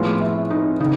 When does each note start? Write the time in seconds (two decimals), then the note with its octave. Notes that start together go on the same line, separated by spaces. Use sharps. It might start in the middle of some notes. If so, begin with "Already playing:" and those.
Already playing: A2 F3 G#3 B3 F4
0.20 E4
0.50 D#4
0.80 C#3 D#4